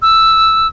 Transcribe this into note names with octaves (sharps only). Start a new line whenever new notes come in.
E6